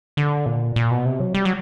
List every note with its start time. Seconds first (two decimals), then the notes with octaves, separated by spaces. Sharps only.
0.17 D3
0.46 A#2
0.76 A#2
0.91 B2
1.05 C3
1.20 F#3
1.34 G3
1.45 F#3